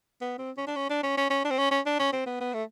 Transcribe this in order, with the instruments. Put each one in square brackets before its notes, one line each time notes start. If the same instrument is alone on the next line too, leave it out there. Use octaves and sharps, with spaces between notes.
[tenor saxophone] B3
C4
C#4
D4
C#4
D4
C#4
C#4
C#4
D4
C4
C#4
C#4
D4
C#4
C4
B3
B3
A3